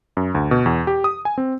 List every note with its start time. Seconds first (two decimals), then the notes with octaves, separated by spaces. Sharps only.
0.17 F#2
0.35 D2
0.51 B2
0.66 E2
0.87 G4
1.04 D#6
1.25 G#5
1.38 C4